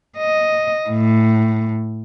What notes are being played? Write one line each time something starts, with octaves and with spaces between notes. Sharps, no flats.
D#5
A2